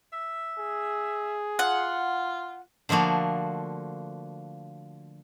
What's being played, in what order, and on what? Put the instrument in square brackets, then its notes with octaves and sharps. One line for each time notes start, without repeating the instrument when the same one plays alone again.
[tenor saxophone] E5
[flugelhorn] G#4
[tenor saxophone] F4 [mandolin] F#5
[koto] D3 F3 A3 A#3 F#4